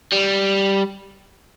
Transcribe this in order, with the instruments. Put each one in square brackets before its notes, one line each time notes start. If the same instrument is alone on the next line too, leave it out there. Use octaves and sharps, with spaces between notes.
[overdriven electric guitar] G3